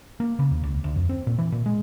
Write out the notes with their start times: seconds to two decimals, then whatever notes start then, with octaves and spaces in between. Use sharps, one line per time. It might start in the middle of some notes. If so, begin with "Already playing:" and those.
0.20 A#3
0.39 C#3
0.51 D#2
0.64 C#2
0.84 D2
0.96 F2
1.09 C4
1.27 A#2
1.38 E3
1.52 A#2
1.66 G#3